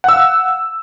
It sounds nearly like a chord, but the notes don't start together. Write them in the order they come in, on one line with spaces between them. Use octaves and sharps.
F#5 E6 F5